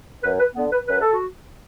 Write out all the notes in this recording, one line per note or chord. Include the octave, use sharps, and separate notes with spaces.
F#2 B4
B4
D3 B3
B4
F#2 B4
A4
F#4